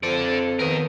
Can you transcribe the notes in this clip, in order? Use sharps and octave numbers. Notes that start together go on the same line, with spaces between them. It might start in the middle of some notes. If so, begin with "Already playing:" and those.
F2 C4 A4 D5
D#2 B2 A#4 D#5